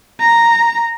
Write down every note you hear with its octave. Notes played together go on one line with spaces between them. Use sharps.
A#5